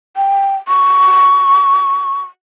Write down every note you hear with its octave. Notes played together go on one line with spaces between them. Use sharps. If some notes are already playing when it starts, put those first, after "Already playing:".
G5
C#6